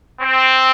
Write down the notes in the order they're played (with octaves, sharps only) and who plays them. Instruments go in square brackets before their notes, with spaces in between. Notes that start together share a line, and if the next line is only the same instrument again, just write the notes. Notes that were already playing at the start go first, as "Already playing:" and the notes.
[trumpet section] C4